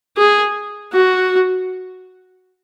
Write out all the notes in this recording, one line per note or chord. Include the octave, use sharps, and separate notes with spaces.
G#4
F#4